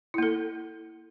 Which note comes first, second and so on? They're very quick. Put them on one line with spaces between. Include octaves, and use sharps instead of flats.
E4 A#3 A4